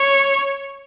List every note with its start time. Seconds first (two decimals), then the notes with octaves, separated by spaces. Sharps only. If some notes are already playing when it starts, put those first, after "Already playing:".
Already playing: C#5